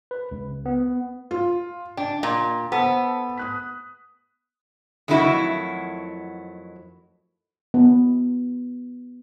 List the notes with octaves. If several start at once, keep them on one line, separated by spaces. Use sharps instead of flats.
B4
C#2
B3
F4
D4 G5
A#2
B3 A4 C5
D#6 F#6 B6
F2 D#3 F#3 A3 E4 F#4
B3